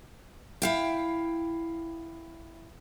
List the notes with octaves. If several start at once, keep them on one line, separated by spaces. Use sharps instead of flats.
E4 F5 G5